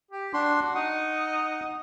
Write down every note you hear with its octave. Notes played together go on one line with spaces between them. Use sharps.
G4
D4 F#4 C6
D#4 F#5